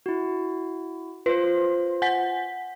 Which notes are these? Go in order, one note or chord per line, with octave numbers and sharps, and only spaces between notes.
E4 F#4
F4 B4 C5
F#5 G#5 B6